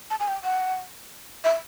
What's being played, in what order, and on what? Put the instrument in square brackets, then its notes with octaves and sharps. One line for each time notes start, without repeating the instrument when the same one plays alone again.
[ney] A5
G#5
G5
F#5
E5